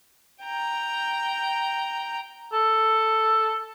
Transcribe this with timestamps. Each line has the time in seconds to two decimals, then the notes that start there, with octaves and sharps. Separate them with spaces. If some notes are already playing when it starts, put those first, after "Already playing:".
0.44 G5 A#5
2.53 A4